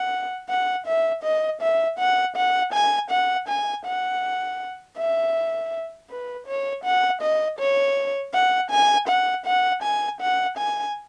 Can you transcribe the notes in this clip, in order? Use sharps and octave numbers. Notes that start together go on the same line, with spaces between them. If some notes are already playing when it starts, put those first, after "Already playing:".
Already playing: F#5
F#5
E5
D#5
E5
F#5
F#5
G#5
F#5
G#5
F#5
E5
B4
C#5
F#5
D#5
C#5
F#5
G#5
F#5
F#5
G#5
F#5
G#5